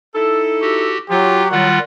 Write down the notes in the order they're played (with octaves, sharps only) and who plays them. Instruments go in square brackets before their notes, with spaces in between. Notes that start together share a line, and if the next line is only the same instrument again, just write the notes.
[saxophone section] D#4 E4 A4
[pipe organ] F#4 G4
[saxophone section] F#3 [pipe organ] F4 [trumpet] G4
[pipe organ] D#3 G3 F4 [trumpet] F#5